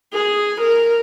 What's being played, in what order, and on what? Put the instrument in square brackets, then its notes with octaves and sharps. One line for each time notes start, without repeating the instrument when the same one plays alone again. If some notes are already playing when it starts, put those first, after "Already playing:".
[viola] G#4
A#4